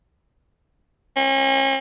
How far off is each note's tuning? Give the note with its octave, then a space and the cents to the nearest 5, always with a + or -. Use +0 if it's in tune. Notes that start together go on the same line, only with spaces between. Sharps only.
C#4 -40